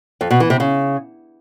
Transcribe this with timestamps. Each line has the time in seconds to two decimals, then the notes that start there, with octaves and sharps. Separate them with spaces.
0.21 F2
0.31 B2
0.40 E3
0.50 C3
0.60 C#3